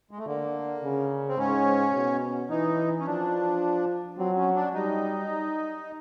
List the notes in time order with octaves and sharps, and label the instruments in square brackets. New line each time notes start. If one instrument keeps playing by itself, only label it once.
[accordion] G#3
A3
[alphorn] D3 [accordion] A#3
[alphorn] C#3
[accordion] C4
[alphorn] G#2 [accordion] C#4
[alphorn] B2
[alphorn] E3 [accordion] D#4
[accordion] C#4
[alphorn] F3 [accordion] D4
[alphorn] F#3 [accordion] C4
[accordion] C#4
D4
[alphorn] G3 [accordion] D#4